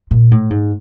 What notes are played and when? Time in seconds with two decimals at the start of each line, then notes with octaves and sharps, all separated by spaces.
0.11 A#2
0.31 A2
0.50 G#2